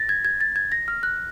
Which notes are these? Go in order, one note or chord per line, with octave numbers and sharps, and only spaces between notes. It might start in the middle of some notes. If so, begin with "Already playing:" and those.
Already playing: A6 A#6
G#6
G#6
A6
G#6
A#6
F6
F#6